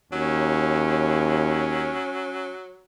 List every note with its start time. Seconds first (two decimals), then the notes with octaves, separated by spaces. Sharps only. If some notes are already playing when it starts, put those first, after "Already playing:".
0.13 D#2 F#3 C#4